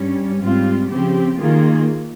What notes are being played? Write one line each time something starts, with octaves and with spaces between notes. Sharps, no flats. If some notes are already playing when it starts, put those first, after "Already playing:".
Already playing: G2 G3 C#4
G#2 G3 C4 F4
C#3 F3 C4 G4
D#3 A#3 F4 G#4